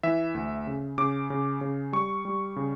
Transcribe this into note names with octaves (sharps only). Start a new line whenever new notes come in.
E3 E5
D2
C#3
C#3 D6
C#3
C#3
G3 C#6
G3
C#3